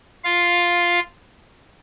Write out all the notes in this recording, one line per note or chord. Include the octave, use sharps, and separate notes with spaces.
F4 F5